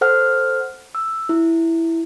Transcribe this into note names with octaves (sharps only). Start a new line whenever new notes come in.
A4 C5 F#5 F6
E6
E4